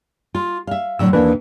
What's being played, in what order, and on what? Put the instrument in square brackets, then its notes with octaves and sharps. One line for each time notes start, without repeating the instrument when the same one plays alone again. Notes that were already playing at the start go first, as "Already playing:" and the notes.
[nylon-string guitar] F4
E5 F5
[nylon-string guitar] A2 D3 F#3 [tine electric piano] E6
[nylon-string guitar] D#2 B2 E3 [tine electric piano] A#3 D4 B4